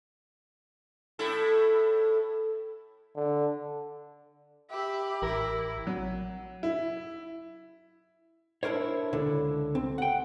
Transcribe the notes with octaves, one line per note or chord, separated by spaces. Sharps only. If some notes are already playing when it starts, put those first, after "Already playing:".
A2 E4 A4
D3
G4 E5 B5
A1 E4 A#4
F#3
E4
D4 E4 A#4 C5 C#5
C#2 D3
C4
F#5 G5